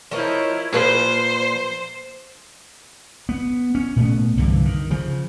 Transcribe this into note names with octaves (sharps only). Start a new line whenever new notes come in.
F3 E4 A#4 C#5 D#5
A#2 F3 B4 C5
B3
C#4
A#2 A3 B3
C2 G2 D3 E3
D#3
C#3 F3